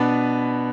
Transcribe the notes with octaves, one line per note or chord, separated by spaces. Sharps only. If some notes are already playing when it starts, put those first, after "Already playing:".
Already playing: B2 B3 D4 B4 B5